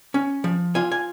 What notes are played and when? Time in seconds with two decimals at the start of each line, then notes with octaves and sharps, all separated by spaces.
0.14 C#4
0.44 F3
0.75 F4 G#5
0.92 G#5